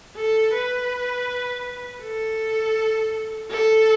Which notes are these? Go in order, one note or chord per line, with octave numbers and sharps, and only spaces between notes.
A4
B4
A4
A4